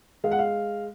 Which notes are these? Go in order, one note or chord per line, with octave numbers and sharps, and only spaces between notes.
G#3 F5
F#5
F5